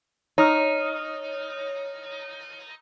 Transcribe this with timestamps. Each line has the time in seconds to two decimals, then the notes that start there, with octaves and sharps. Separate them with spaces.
0.38 D#4 C#5 D#6 F6